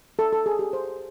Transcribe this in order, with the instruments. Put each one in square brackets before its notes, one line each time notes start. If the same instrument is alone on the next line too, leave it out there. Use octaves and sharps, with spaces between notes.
[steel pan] A4
A4
G#4
G4
C5